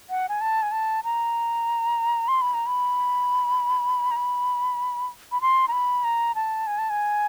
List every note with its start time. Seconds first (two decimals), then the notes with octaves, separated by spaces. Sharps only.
0.10 F#5
0.29 G#5
0.41 A5
0.62 G#5
0.72 A5
1.04 A#5
2.28 C6
2.42 B5
2.54 A#5
2.67 B5
4.11 A#5
4.16 B5
5.32 B5
5.41 C6
5.68 A#5
5.72 B5
6.04 A#5
6.35 A5
6.67 G#5
6.78 A5
6.90 G#5